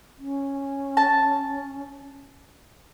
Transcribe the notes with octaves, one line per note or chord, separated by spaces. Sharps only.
C#4
A5